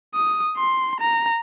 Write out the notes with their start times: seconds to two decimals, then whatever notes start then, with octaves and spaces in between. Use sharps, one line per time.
0.14 D#6
0.57 C6
1.00 A#5